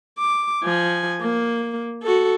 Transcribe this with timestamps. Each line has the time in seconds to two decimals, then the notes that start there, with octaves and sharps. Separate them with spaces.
0.18 D6
0.63 F3 G#5
1.21 A#3
2.03 F#4 A4